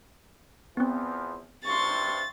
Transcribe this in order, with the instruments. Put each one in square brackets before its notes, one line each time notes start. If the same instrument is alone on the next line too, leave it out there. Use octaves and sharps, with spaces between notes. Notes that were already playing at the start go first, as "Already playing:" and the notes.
[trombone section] E2 E3 F3 [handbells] B3 C4
[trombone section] G2 C3 [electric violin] C6 C#6 [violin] A6